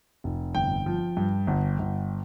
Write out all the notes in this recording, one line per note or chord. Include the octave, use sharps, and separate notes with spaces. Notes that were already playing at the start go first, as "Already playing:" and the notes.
F1
G1 G5
F3
G2
G1
G1